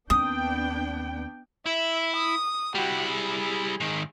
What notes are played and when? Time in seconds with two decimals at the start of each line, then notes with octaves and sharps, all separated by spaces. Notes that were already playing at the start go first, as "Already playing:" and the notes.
0.10 D#2 B3 C4 D4 G5 D#6
1.66 E4 E5
2.16 D#6
2.75 G3 E4 F#4 G4
3.08 G#4
3.80 G#2 D#3